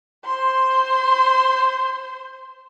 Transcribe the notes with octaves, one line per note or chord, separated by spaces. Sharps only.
C5 C6